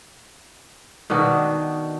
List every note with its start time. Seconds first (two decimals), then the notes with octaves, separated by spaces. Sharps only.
1.10 B2 D#3 D4 F#4